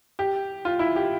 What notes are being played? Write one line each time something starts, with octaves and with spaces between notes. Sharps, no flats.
G4
F4
E4
G4